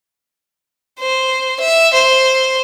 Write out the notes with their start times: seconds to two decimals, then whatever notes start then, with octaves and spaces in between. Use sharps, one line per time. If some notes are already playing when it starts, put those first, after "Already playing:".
1.00 C5
1.60 E5
1.94 C5